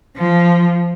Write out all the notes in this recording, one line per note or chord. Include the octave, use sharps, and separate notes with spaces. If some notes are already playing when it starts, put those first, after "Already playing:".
F3